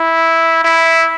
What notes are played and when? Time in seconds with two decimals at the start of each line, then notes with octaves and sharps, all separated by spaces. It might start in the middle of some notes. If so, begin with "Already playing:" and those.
Already playing: E4
0.64 E4